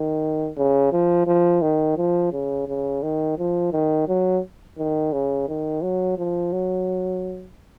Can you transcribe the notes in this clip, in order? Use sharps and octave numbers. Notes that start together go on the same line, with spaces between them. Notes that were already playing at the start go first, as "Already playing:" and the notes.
Already playing: D#3
C#3
F3
F3
D#3
F3
C#3
C#3
D#3
F3
D#3
F#3
D#3
C#3
D#3
F#3
F3
F#3